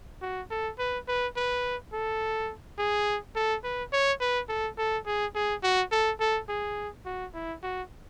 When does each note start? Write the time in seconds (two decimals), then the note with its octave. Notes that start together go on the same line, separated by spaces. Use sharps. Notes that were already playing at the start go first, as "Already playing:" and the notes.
0.22 F#4
0.51 A4
0.79 B4
1.08 B4
1.37 B4
1.93 A4
2.78 G#4
3.36 A4
3.64 B4
3.93 C#5
4.20 B4
4.49 A4
4.78 A4
5.06 G#4
5.35 G#4
5.63 F#4
5.92 A4
6.20 A4
6.49 G#4
7.06 F#4
7.34 E4
7.63 F#4